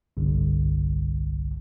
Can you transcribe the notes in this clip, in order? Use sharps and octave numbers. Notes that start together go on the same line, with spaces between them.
G1 C2